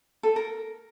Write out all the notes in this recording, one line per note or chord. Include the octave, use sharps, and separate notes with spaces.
A4
A#4